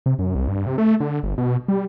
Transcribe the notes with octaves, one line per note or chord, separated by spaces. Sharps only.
C3
F#2
C2
G2
C3
A3
D3
G1
B2
G3